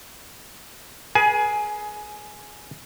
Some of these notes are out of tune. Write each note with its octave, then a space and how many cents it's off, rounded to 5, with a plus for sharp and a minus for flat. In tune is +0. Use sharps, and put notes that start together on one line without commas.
G#4 +10 B4 -45 G#5 +25